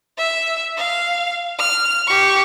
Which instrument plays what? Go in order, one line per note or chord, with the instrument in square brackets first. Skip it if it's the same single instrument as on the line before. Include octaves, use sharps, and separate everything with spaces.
[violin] E5
F5
F6
G4 C#6